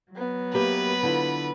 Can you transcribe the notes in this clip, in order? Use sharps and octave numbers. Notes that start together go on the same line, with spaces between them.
F#3 B3
A#3 G4 B4 E5
D3 E4 F4